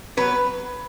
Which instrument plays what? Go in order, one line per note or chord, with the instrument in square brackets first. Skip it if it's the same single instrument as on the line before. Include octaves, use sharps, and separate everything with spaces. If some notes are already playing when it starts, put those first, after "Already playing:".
[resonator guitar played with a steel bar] F#3 B3 B4